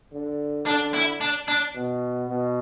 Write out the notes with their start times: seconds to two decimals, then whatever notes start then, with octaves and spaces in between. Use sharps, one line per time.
0.13 D3
0.66 D3 D4
0.94 E4
1.21 D4
1.48 D4
1.75 B2
2.28 B2